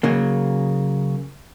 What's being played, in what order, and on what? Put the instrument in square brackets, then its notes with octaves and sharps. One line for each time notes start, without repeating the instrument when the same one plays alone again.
[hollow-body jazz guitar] C#3 F#3 A#3